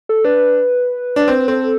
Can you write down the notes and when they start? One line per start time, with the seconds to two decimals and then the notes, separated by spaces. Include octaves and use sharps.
0.09 A4
0.24 D4 B4
1.16 D4
1.28 C4
1.48 C4 A4